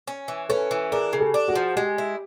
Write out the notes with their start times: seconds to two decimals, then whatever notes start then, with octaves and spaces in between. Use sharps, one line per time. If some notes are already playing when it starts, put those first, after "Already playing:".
0.07 C#4
0.28 E3
0.49 C#4 A4 B4
0.71 E3
0.92 D4 G#4 A#4
1.13 C#3
1.20 G4 A4
1.34 D4
1.48 F#4 G#4
1.55 F3
1.76 G#3 G4
1.98 E4